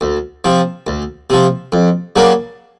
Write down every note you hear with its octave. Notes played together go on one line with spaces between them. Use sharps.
D2
C3 F3
D2
C3 F3
F2
C#3 F#3 A#3 D4